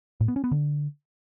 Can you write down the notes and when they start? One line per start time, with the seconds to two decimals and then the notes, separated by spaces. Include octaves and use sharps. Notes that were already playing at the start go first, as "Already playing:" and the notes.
0.21 A2
0.28 B3
0.36 C#4
0.44 B3
0.51 D3